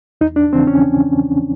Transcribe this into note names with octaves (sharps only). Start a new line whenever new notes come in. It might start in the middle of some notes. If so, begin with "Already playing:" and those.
E2 D#4
D4
C#3 E3 C4
C#4